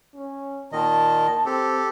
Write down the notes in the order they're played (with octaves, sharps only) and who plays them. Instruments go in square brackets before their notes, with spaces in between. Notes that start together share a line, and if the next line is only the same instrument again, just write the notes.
[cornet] C#4
[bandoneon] A#2 D#3 D#5 [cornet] A5
[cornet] C4 [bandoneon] G4 A4